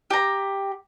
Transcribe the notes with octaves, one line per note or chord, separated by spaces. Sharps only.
G4 A#5